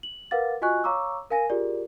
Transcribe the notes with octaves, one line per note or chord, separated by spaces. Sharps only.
F#7
A#4 B4 F5 F#5 D6 A6
F4 F#4 D#5 G#5 C#6 F#6
C#5 F5 A#5 C#6 D6 E6
A#4 F5 G#5 A#6 D#7
F4 G4 G#4 A#4 D5